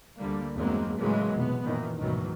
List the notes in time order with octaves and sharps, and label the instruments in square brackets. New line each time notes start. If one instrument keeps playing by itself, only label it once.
[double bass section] D2 D3 G3 A3 A#3
E2 G2 F#3 G#3 A#3 C4
A2 C#3 E3 F#3 G#3 A#3
F1 B2 B3
F#2 A#2 D#3 E3
D2 G#2 B2 D#3 E3 F#3